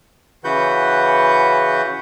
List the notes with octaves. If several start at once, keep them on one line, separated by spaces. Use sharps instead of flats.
C#3 E3 F#4 B4 F#5 G6